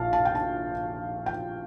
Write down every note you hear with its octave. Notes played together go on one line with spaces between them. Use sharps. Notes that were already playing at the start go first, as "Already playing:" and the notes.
Already playing: A#1 A#2 F5 A5
A5
G5
A5
G5